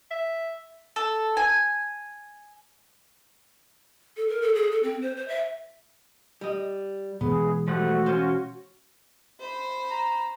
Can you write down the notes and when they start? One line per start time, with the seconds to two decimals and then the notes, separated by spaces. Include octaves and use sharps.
0.11 E5
0.96 A4
1.37 G#5
4.17 A4
4.29 A#4
4.42 A4
4.55 G#4
4.71 A4
4.83 C4
5.02 C5
5.17 C5
5.28 E5
6.41 G3 D#5
7.21 B2 E3 G#3 B3 G#4
7.68 F3 G3 A3 F#4 F#5
8.06 C#4 F4 C5
9.40 C5 B5
9.91 A#5